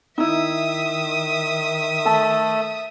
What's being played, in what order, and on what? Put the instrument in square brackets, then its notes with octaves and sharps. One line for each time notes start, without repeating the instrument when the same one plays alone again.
[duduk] D#3 [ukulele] D#4 E4 [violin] E5 D#6
[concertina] A3 A4 [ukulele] A5